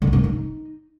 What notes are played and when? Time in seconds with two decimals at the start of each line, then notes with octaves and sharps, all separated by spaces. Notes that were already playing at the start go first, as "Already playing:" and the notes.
0.02 D3
0.07 B3
0.13 C#3
0.18 D#3
0.24 D#4